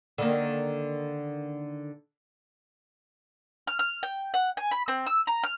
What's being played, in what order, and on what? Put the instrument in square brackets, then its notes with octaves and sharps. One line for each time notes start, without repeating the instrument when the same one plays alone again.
[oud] D3 D#3 A#3
[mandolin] F6
F6
G5
F#5
G#5
B5
C4
E6
A#5
F6